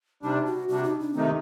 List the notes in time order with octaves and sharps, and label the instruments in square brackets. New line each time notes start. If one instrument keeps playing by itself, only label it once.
[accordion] C3 G3 D4 [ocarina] D#4
[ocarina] F#4
[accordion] C3 G3 D4 [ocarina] F#4
[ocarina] D#4
D4
[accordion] C3 D#3 A3 D#4 [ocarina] C4